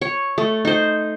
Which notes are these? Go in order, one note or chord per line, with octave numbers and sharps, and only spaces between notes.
C#5
A3
D#4 C5